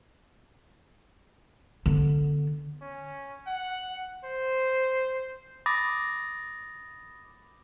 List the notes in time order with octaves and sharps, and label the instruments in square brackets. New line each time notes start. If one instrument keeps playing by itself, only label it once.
[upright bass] D3 B3
[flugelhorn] C#4
F#5
C5
[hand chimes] B5 D6 D#6 A6 A#6